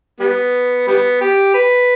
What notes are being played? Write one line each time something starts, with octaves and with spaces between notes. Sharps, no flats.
G3 B3
G3 B3
G4
B4